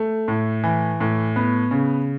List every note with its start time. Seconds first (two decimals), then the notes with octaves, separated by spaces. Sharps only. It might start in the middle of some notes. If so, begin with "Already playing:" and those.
Already playing: A3
0.28 A2
0.64 E3
1.00 A2
1.36 B3
1.71 C#3